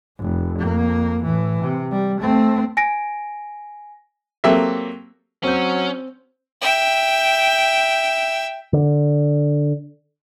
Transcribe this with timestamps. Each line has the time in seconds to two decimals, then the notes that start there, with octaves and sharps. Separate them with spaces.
0.19 F1
0.59 F2 A#3
1.24 A2 E3
1.61 C3
1.91 G3
2.21 A3 C4
2.77 G#5 A#6 D7
4.44 F#3 A#3 C4 G4 A4 E5
5.43 F#3 C4 C#4 G6
6.61 E5 G5
8.73 D3